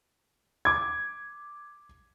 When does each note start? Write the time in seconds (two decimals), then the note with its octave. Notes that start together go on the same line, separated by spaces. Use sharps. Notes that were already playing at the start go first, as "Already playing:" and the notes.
0.65 D6 G#6